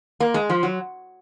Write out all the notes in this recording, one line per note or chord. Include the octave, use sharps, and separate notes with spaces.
A#3
G#3
F3
F#3